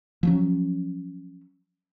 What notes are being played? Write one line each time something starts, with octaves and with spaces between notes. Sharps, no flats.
F3 F#3 C#4